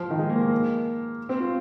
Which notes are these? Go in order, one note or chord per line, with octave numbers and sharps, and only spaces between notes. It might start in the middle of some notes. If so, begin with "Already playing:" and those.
Already playing: F3
D#3
G#3
A#3
A#3
C4
F4